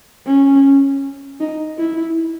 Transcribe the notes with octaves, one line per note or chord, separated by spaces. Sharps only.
C#4
D#4
E4